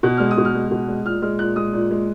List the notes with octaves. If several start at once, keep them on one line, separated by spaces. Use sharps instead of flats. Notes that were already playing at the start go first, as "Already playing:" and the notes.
B2 F#6
G#3 F6
D#6
B2
F6
G#3
B2
G#3
A#2 F6
G#3 F6
A#2 F#6
G#3 D#6
A#2
G#3